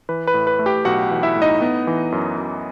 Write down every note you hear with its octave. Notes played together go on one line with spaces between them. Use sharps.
E3 B4
B4
A2
B4
A3
G4 G5
B1 F#4 F#5
E3
E4 E5
A2
D#4 D#5
B3
E3
F#2
F#2